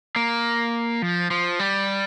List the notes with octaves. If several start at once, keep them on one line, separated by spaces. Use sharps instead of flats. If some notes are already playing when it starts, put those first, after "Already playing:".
A#3
F3
F3
G3